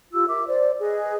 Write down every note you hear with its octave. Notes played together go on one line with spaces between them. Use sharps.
F4 G4 E6
A#4 E5 D6
C5 D5
G#4 B4 D#5